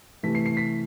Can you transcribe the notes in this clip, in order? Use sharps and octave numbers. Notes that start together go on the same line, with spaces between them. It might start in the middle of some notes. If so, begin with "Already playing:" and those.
C3 E3 A3 B6
C7
C7
B6